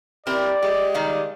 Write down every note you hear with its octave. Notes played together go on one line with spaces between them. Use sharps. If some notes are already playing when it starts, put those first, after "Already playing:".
C4 E4 G4 A#4 D5
G#3 G4
D#3 G3 F5